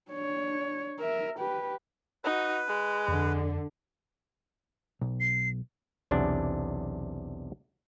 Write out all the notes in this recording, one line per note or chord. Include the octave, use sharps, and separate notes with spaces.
D4 C#5
A#4 E5
G4 B4
D#4 F#4 B4
G#3
F2 D3
B1
C7
B1 E2 C3 D4